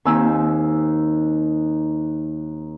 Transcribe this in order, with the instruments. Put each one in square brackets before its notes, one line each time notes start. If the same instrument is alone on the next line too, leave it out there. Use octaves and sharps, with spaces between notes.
[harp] D#2 D#3 C4 G#5 E6